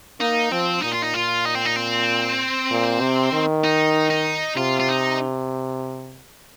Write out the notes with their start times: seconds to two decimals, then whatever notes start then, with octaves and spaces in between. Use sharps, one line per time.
0.20 A#3 D#4
0.52 F3 C4
0.82 A#2 D#4
0.92 F4
1.02 D#4
1.14 F4
1.45 D#4
1.55 C4
1.65 D#4
1.76 C4
2.70 A#2
3.01 C3
3.33 D#3
3.64 D#4
4.10 D#4
4.57 C3 F4
4.80 F4
4.89 D#4